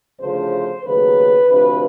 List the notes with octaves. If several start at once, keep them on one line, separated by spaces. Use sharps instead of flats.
D2 C#3 F3 A3 C5
D#2 C#3 F#3 A3 B4
D2 C3 F3 B4